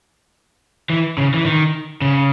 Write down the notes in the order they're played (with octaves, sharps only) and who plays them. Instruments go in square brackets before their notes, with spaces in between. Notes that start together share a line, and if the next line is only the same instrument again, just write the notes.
[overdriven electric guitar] E3
C#3
E3
D#3
C#3